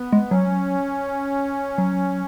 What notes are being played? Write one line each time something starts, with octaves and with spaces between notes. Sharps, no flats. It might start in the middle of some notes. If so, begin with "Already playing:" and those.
Already playing: B3
G#3
F#3 C#4
F#3